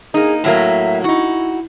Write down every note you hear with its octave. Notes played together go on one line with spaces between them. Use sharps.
A#3 D#4 G#4
A2 F#3 A#3 E5
D#4 E4 F#4